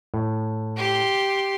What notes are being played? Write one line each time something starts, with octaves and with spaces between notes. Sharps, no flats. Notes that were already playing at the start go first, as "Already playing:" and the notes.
A2
G4 C6